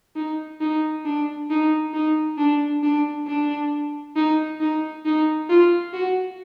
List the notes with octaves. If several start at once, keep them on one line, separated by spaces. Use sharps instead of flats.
D#4
D#4
D4
D#4
D#4
D4
D4
D4
D#4
D#4
D#4
F4
F#4